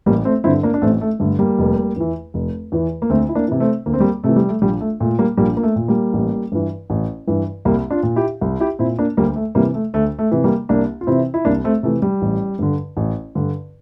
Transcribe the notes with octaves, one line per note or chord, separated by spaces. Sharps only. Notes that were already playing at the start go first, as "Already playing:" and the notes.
A1 G3 A#3
A3 C4
G2 D3 C4 E4
A#3 D4
D4
A1 A3 C4
A3
G2 D3 A3
G3 A#3
F1
E2 E3
F1
E2 E3
A#3
D2 A3 C4
E4
A#3 D4
C3 E3
A3 C4
D2 A#3
C4
G3 A#3
C3 E3 A3
G3
A3
A#1 G3
A3
A#2 A3
G3 A#3
A#1 G3 A#3
A#3
A3
A#2
G3 A#3
A1
G2 E3
A1
G2 E3
C2 G3 A#3
D4 F4
A#2
E4 G4
C2
E4 G4
A#2 C4 E4
A#3 D4
D2 G3 A#3
A3
C3 E3 G3 A#3
A3
D2 A3
A3
C3 E3
G3 A#3
C2 A#3 D4
F4
C3 E3 C4 E4
E4
C2 A#3 D4
A3 C4
C3 E3 A3
G3
A1
G2 D3
A1
G2 D3